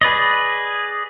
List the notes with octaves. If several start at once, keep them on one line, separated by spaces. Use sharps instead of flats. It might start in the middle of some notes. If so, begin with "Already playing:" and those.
G#4 B4 D5 D#5